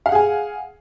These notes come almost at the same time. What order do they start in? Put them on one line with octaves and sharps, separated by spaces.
F5 F#5 G#4 G#5